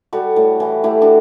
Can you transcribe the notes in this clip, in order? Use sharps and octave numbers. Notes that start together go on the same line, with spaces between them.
G3 F#4 A4
A2
E3
A3 E4 G4
D4 F#4